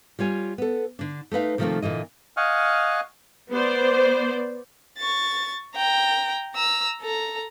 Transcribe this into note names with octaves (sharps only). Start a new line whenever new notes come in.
G3 F4 C#5 G#5
B3 A4
D3 D4
A3 D#4 B4 F5
C3 D#3 F3 A3 A#3 C4
A#2 D3 E3 D#5
D#5 F5 F#5 G#5 C#6 F6
B3 C5 D5
C#6 A6
G5 A#5
A#5 E6
A4 A#5